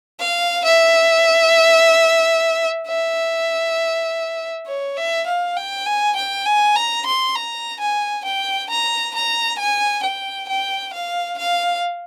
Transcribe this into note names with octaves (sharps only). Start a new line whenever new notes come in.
F5
E5
E5
C#5
E5
F5
G5
G#5
G5
G#5
A#5
C6
A#5
G#5
G5
A#5
A#5
G#5
G5
G5
F5
F5